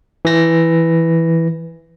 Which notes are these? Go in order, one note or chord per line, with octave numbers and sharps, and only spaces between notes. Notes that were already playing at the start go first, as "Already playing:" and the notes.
E3 A#6